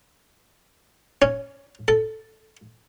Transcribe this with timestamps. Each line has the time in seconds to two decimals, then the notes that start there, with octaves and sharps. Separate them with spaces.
1.22 C#4
1.88 A4